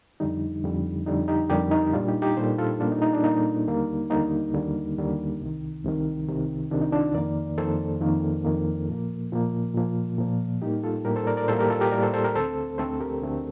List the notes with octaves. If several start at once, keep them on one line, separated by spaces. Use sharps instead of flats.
F2 D3 G3 D#4
F2 D3 G3
F2 D3 G3 D#4
D#4 G4
F2 D3 G3 G4 A#4
D#4
A#2 G3 A#3 D4 F4
D#4 G4
D#4 G4
A#2 G3 A#3 A4 C5
F4 A4
A#2 G3 A#3 D4 F4
D#4
D#4
D4
A#2 G3 A#3 D#4
D#2 D3 G3 A#3
D#2 D3 G3 A#3 D#4
D#2 D3 G3 A#3
D#2 D3 G3 A#3
C2 C3 D#3
C2 C3 D#3
C2 C3 D#3
C2 C3 D#3 D4
D#4
D4 F4
F2 D#3 A#3 A#4 D5
F2 D#3 A#3 A4 C5
F2 D#3 A#3
F2 D#3 A#3
A#2 F3 A#3
A#2 F3 A#3
A#2 F3 A#3
A#2 F3 A#3
A2 G3 A#3 D#4 G4
F4 A4
A2 G3 A#3 G4 A#4
A4 C5
A#4 D5
A#4 D5
A2 G3 A#3 A4 C5
G4 A#4
F4 A4
G4 A#4
A2 G3 A#3 A#4 D5
A4 C5
A4 C5
G4 A#4
D2 D3 A3 C4 A4 C5
D2 D3 A3 C4 A4 C5
G4 A#4
D2 D3 A3 C4